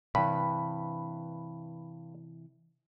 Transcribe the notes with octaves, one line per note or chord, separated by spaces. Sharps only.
G2 C3 E3 B5